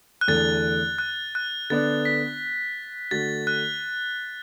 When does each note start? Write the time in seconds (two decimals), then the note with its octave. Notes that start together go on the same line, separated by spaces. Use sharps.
0.21 F#6
0.28 E2 D3 A3 A6
0.99 F#6
1.35 F#6
1.70 D3 B3 D4 A6
2.05 B6
3.11 D3 A3 F#4 A6
3.47 F#6